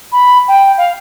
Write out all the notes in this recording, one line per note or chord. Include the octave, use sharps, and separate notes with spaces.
B5
G5
F5